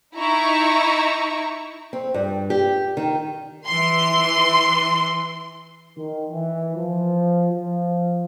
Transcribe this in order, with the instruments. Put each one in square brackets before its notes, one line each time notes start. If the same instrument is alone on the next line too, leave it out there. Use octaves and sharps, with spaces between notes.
[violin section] D#4 E4 A#5 C#6
[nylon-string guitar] C4
G2
G4
D#3
[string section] E3 C6
[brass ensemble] D#3
E3
F3
F3